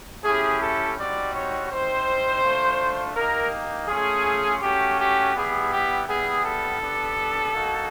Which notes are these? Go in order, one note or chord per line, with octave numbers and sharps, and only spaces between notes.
A3 C#4 E4 G4 G#4
A4
G3 C4 D#4 F#4 D5
C#5
G3 C4 D#4 C5
A3 D4 F4
A#3 D#4 G4 A#4
A3 C#4 F4 G#4
A3 C#4 F#4 G4
G4
G3 B3 E4 G4 G#4
G4
G3 B3 E4 G#4
A4
B3 D4 G4
A#3 D#4 F#4